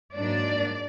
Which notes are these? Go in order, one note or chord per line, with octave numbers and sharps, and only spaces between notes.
G#2 F#3 A#3 D4 D5